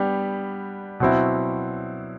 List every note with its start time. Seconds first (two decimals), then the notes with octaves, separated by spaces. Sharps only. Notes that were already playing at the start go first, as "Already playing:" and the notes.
Already playing: G3 B3 D4 G4
1.00 B2 F#3 C4 E4